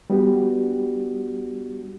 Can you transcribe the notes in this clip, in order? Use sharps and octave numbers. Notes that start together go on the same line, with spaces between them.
G3 B3 D4 F#4 G4